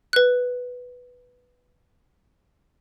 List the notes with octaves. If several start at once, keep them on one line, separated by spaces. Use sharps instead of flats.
B4 F#6